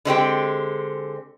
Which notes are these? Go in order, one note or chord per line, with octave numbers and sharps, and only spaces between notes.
D3 G#3 C4 G4